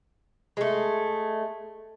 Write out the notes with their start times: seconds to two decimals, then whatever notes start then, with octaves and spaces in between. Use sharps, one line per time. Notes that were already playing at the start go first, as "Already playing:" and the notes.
0.57 G#3 A3